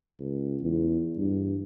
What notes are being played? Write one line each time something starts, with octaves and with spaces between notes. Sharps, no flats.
C#2
E2
G2